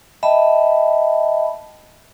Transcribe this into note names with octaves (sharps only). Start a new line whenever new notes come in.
D#5 E5 G5 A5 B5